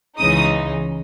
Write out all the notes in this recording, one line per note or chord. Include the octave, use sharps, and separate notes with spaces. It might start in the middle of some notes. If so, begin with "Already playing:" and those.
C#2 C#3 E3 G#3 D#4 D#6